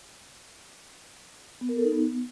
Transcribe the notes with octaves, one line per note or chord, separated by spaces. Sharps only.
B3
A#4
A4
D#4
B3